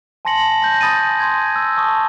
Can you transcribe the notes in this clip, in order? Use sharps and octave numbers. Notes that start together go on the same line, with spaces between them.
G#5 A5 C6 A#6 C#7 F#7
G6 A#6
G#5 B5 D#6 A6 A#6 D#7
C6 G#6
E6
A5 C#6 D#6